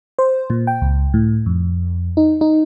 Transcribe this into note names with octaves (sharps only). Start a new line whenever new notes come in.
C5
A#2
G5
C#2
A2
F2
D#4
D#4